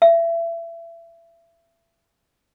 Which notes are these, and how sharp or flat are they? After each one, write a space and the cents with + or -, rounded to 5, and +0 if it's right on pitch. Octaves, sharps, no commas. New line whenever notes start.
E5 +30